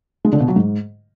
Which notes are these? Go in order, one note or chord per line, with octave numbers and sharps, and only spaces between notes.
G#3
D3
B2
F#3
G#2